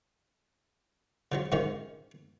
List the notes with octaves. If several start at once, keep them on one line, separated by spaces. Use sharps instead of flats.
C#3 F3 F#3
G#2 C3 D#3 F3 C#4